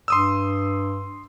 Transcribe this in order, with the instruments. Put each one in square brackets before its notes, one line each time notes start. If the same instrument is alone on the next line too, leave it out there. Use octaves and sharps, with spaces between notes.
[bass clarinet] G2 [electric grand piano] C6 D#6 E6